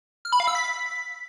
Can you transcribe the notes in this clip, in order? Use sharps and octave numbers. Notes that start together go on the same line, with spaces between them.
F6
B5
F5
E6
B6